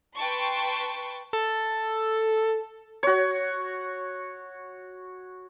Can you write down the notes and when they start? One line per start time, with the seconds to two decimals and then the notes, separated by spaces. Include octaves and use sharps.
0.16 B4 G5 A5 C6 C#6
1.33 A4
3.03 F#4 C#5